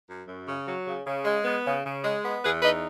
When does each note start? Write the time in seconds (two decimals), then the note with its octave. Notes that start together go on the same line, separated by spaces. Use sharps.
0.08 F#2
0.27 F#2
0.47 C#3
0.66 F#3
0.87 C#3
1.06 C#3
1.25 G#3
1.45 B3
1.65 C#3
1.84 C#3
2.04 G#3
2.23 B3
2.42 E2 G#4 B4
2.62 D#4 B4 D#5